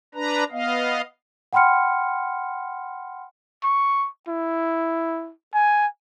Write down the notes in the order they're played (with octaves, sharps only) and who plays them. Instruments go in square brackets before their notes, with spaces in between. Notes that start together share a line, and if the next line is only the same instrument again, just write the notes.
[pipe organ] D4 B4 A#5
B3 D#5 F5
[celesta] F#5 G5 B5 C6 F6 C#7
[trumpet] C#6
E4
G#5